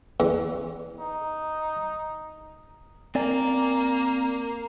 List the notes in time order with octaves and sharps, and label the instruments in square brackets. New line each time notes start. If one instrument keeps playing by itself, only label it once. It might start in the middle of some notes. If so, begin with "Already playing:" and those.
[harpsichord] E2
[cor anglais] D#4
[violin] A#3 [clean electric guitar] C4 D5 G#5